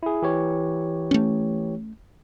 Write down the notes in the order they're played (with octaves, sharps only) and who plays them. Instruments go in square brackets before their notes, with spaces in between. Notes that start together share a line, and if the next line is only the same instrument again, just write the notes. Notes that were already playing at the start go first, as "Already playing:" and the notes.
[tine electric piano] E4 G#4
E3 G4 C#5
[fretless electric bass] A3 C#4